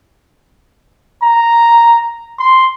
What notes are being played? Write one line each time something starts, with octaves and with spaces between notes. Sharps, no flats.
A#5
C6